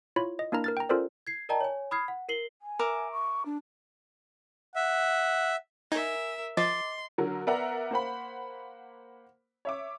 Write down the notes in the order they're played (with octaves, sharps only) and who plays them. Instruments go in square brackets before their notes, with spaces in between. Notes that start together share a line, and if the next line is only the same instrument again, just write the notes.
[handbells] E4 F4 C#5 B5
D#5
A#3 D4 E4 A#4 A#5
A#4 F6 A6
G5 A#5
C#4 F4 A4 A#4 C5 D5
[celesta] G#6 C7
A#4 D5 D#5 G5 A5 A#5
C#5 G#5
B5 D#6 F6 G#6 C7
F#5
A#4 C7 F#7 G7
[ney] G#5
[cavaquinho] A#4 E5 D6
[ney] C#6
D4
[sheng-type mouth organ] E5 [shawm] F#5
[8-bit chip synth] D#4 [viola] A#4 E5 [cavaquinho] G#5
[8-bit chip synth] F3 [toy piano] D#5 [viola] C6 [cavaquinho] D6
[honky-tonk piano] D3 F#3 A#4
B3 A#4 D5 E5 F#5 A#5
A#3 C5 F#5 B5
C#5 E5 D6